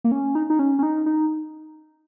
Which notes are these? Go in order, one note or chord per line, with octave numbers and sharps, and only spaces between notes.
A#3
C#4
D#4
D#4
C#4
C#4
D#4
D#4